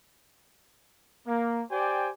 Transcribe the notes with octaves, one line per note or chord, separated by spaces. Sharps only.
A#3
G4 C5 D5 G5 G#5